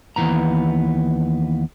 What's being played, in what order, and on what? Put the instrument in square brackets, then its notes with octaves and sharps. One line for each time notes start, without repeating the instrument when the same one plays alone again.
[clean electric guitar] D#2 E3 B3 A#5